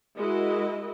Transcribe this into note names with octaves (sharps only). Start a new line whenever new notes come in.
G#3 E4 F#4 A#4 D#5